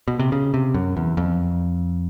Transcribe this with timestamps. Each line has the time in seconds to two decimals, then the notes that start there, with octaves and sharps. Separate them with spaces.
0.08 B2
0.19 C3
0.32 C#3
0.54 C3
0.74 F#2
0.97 E2
1.17 F2